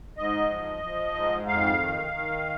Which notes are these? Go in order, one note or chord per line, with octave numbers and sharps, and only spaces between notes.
G#2 D#5
F3
F3
G#2
F2 F5
D#3
D#3